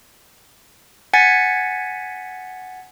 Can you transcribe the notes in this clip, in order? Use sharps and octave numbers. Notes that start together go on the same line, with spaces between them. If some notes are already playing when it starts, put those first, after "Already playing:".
F#5 G#5 G#6 A6 B6 C#7